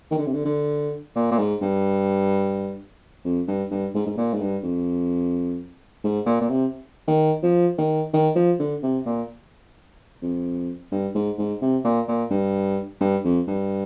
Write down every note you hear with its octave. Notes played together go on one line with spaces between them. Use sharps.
D#3
D3
C3
D3
D3
A#2
A#2
G#2
G2
F2
G2
G2
G#2
G#2
A#2
G#2
G2
F2
G#2
A#2
A#2
C3
D#3
F3
D#3
D#3
F3
D3
C3
A#2
F2
G2
G#2
G#2
C3
A#2
A#2
G2
G2
F2
G2